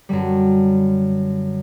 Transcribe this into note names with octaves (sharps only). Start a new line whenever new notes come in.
F#2 D3 G3